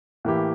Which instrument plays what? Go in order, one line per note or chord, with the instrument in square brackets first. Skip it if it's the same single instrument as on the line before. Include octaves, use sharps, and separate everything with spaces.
[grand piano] A2 E3 A#3 E4 G4